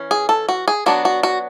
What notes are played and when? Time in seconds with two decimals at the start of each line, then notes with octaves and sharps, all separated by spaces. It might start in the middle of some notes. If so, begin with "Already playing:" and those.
Already playing: E3 C#4
0.11 G#4
0.29 A4
0.49 F#4
0.68 G#4
0.86 F#3 B3 D4 F#4
1.05 F#4
1.23 F#4